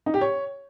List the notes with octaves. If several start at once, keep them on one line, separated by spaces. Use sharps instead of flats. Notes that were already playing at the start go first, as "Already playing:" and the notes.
D#4
G4
C#5